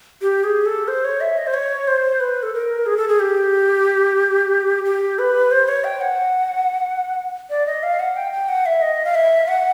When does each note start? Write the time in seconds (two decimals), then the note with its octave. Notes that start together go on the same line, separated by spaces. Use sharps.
0.22 G4
0.44 G#4
0.66 A4
0.88 C5
1.05 C#5
1.21 E5
1.38 D#5
1.47 C5
1.54 C#5
1.88 C5
2.20 B4
2.43 A4
2.54 A#4
2.86 G#4
2.97 A4
3.08 G#4
3.20 G4
4.85 G4
5.19 B4
5.51 C5
5.68 C#5
5.84 G5
6.01 F#5
7.50 D5
7.66 D#5
7.83 F5
7.99 F#5
8.16 G5
8.32 G5
8.48 F#5
8.66 E5
8.82 D#5
9.05 F5
9.15 E5
9.48 F#5